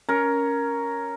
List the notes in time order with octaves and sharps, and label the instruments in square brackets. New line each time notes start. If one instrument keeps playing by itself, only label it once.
[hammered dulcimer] C#4 A#4